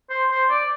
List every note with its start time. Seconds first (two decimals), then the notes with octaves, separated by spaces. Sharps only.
0.10 C5
0.30 C5
0.50 D5